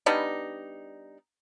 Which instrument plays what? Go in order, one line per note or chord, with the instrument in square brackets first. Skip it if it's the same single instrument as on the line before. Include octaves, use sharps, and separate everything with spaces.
[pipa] G3 B3 D4 D#4